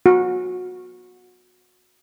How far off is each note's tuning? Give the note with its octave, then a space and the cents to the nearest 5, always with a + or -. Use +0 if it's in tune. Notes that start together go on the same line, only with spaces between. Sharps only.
F#4 -25